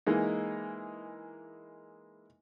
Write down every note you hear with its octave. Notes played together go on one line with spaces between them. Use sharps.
E3 G#3 A#3 D#4